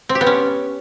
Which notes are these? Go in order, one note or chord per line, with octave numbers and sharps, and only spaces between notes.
C4
G4
B3
C#4